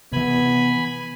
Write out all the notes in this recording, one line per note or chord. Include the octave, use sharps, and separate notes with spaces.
C3 E3 B3 G#5 B5